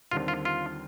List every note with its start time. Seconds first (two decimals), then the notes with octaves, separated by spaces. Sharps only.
0.11 D#2 D3 G3 C4 F4
0.28 F4
0.45 F4